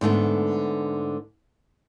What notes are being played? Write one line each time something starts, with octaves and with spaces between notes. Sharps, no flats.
G#2 D3 A3 B3